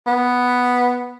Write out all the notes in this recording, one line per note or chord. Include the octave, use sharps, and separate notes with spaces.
B3